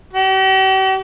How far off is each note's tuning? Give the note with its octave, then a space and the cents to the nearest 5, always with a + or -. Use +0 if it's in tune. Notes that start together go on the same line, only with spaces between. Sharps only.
G4 -45